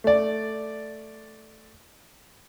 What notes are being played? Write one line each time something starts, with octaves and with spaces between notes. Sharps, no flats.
A3 D5